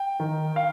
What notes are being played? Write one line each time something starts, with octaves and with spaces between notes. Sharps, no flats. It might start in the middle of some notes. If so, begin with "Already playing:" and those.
Already playing: G5
D#3
F5